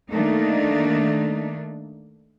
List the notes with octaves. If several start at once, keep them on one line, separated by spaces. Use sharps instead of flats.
D#3 A3 A#3 D4 D#4